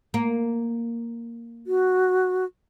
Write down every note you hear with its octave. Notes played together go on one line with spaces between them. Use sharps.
A#3
F#4